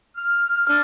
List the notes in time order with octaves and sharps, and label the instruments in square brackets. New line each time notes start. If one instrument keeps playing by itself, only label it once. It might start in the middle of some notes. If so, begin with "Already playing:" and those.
[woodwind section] F6
D4